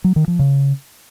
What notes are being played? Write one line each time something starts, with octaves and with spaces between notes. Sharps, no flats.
F#3
D#3
F3
C#3